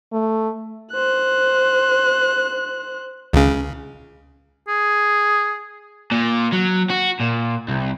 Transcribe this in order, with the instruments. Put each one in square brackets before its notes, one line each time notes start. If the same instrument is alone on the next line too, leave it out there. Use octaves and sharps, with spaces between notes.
[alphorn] A3
[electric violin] C5 F#6
[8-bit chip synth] C#2 C#3
[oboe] G#4
[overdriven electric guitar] A#2
F#3
F#4
A#2
C2